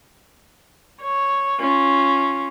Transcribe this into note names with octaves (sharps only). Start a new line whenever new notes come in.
C#5
C#4 F4